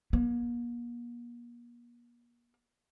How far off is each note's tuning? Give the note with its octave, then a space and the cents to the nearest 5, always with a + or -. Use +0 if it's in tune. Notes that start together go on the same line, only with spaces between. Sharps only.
A#3 +40